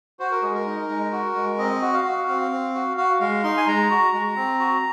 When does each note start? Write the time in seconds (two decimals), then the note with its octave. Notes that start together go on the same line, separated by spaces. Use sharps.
0.19 F#4 C5
0.31 A#4
0.42 G#3 G#4
0.55 A#4
0.66 D#4
0.89 G#3
1.12 F#4
1.35 G#3
1.58 C4 D#5
1.81 F#4
1.93 F5
2.04 F#4
2.27 C4 F5
2.51 C4
2.75 F#4
2.97 F#4 F5
3.20 G#3 F5
3.44 D#4 C6
3.57 G#5
3.67 G#3 A#5
3.90 F#4
4.13 G#3
4.36 C4
4.60 F#4